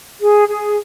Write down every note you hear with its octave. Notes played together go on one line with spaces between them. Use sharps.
G#4
G#4